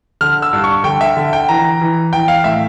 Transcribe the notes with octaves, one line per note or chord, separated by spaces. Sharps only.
D3 F6
E6
G2
C#6
D3 G5
E5
D3
G5
E3 A#5
E3
E3 G5
F5
A2 E5